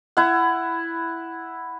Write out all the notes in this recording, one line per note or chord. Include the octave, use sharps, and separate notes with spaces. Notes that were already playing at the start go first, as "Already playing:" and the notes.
E4 F#5